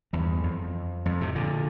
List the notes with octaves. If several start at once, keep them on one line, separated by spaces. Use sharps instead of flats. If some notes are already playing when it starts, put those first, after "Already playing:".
E2 G2
F2
F2
A2 C3
A#2 D3